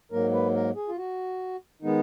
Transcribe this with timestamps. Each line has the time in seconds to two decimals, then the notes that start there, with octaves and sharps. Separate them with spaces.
0.12 G#2 F#3 A#3 A#4
0.33 B4
0.55 A#4
0.76 G#4
0.88 F4
0.97 F#4
1.82 D#3 G#3 B3 D#4